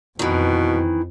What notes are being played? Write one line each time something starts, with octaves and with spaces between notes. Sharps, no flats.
F2 B2 D#3 E3